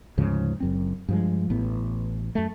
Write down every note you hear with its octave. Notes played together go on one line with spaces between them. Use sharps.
D2 G#2 C#3 F3
F#1 F#2 C4
G2 F3 G#3
A1 A2 B3
F#2 A3